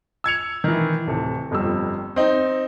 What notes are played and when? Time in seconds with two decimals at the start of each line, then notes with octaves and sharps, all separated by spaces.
0.24 E6 G#6 C#7 F7
0.64 D#3 E3
1.07 D1 C3 A4
1.51 G1 F2 G3 E6
2.16 C4 D#4